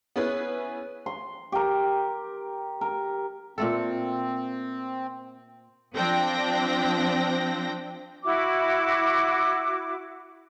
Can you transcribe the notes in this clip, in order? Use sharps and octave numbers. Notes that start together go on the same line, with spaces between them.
B3 C#4 E4 G#4 B4
C6
G4 A#4
A#4
A#2 A3 C4 A4
F3 C4 D4 G5 A#6
E4 F#4 D6